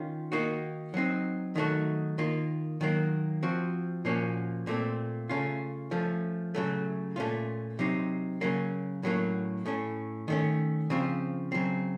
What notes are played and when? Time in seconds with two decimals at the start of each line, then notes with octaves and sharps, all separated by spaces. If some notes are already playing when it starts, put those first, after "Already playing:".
Already playing: D#3 C#4 F4
0.32 D#3 A#3 D#4 F#4
0.94 F#3 C4 D#4
1.56 D#3 F#3 A3 D#4 F#4
2.18 D#3 A#3 F4
2.81 D#3 F#3 A#3
3.43 F3 C4 F#4
4.05 A#2 F3 A#3 C#4 F#4
4.67 A#2 A3 C4
5.29 C#3 A3 C#4 F4
5.91 F3 A3 C#4
6.55 C#3 F#3 A3
7.16 A#2 A3 C#4 F4
7.79 C3 F#3 C4 D#4
8.41 C#3 F#3 A#3 C#4
9.03 A2 F#3 A#3 C#4
9.66 A2 A3 C#4
10.28 D#3 A3 C#4
10.90 C#3 F3 C4 F4
11.52 C#3 F#3 C4